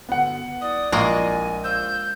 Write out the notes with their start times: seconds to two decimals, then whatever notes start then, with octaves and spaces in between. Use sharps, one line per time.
0.09 G2 B2 D3 B3 F#5
0.61 C2 E4 D5 D#6
0.92 A#1 G#3 A#3 D#5 G#5 C#6
1.64 C5 F5 E6 G6